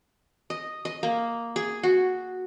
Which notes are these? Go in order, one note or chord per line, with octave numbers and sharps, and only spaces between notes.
D#5
D#5
A#3
G#4
F#4